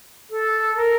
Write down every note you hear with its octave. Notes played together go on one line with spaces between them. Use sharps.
A4
A#4